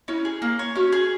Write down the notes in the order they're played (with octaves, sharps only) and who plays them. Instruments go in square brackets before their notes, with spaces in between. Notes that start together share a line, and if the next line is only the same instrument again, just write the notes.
[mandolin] C#4 [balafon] E4
[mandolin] G#4
A#3
C#5
[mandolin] C#4 [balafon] F#4
[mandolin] G#4